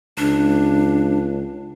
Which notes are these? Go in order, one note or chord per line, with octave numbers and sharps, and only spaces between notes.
C#2 D4